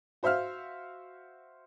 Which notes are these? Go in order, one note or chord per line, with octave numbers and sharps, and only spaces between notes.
F#4 C5 E5 F5 F6